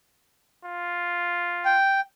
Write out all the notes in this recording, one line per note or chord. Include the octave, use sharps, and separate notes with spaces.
F4
G5